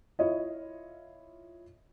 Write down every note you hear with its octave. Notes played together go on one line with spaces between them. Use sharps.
E4 F4 C#5 D#5